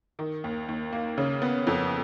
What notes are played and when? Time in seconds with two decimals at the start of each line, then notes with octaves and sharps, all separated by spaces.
0.19 D#3
0.44 D#2
0.68 D#2
0.92 A#3
1.18 C#3
1.42 B3
1.67 F2